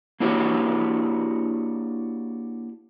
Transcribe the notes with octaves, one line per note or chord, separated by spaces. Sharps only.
A#3 D4 E4 F#4 G4 C#5